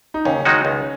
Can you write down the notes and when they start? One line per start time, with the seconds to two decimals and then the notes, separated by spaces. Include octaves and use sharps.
0.14 D#4
0.25 D#2 C#3 C#4
0.45 D#3 G#3 D#4 F#4
0.65 C#2